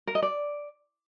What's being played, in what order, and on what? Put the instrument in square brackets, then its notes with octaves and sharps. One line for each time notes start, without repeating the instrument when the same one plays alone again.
[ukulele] A#4
D#5
D5